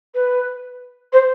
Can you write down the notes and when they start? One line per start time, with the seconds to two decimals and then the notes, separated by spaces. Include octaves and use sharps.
0.14 B4
1.12 C5